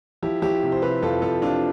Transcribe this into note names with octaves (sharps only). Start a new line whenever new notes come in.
F3 E4 G4
F3 E4 G4
C3
C5
C3 G4 B4
F2 F4 A4
F2 F4 A4
C3 D4 F4